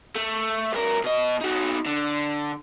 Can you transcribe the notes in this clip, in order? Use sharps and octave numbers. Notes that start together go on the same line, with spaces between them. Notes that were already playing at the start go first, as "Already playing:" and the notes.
A3
G2 A#4
B2 D#5
D#4 F#4
D3